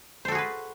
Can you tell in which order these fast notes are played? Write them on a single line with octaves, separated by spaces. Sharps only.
C5 A4 F#4 G#4 B4